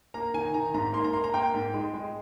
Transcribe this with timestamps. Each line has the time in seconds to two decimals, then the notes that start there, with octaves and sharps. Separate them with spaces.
0.14 A#3 A#5
0.34 D#3 G#5
0.54 D#3 A#5
0.74 G#2 A#5
0.93 A#3 C6
1.04 A#5
1.13 A#3 C6
1.24 A#5
1.34 A#3 G5
1.54 G#2
1.74 G#3
1.94 G#3